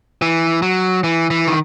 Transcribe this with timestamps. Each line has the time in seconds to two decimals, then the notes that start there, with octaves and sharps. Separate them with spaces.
0.22 E3
0.62 F#3
1.04 E3
1.30 E3
1.48 D#3